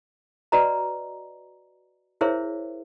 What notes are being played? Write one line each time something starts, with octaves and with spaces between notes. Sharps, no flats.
F#4 B4 D5 D#5 A#5
E4 G#4 A#4 C5 C#5 E5